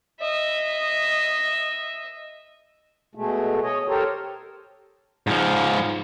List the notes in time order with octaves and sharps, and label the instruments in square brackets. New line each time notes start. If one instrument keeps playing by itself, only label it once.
[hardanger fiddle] D#5 E5
[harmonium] B2 G#3 A3
C#5 D#5
G4 A4 A#4 C5 C#5
[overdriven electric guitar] G#2 F3